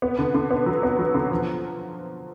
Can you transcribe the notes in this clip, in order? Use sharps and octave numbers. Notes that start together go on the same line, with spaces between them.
B3
D3
D3
B3
F#3
B3
F#3
D3
F3